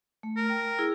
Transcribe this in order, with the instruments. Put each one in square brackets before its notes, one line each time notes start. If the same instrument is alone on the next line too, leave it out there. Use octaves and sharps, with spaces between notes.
[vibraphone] A3
[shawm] A#4
[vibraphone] G5
E4 G#4